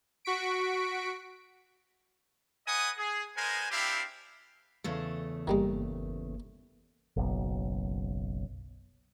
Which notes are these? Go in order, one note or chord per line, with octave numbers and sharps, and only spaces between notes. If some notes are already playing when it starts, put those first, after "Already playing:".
F#4 C#6 B6 D7
B4 D#5 F#5 G#5 D#6
G#4
G#3 B3 A#4 C5 G#5
C4 D4 E4 G4 F5
E2 C#3 A3
G1 D#3 G3 G#3 A#3
F#1 B1